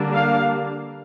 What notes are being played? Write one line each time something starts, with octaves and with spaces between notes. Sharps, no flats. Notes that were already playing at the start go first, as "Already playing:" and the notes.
Already playing: D3 G3 A#3 D4
F5